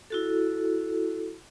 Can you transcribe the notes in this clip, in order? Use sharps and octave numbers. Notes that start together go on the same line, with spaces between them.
E4 F#4 A4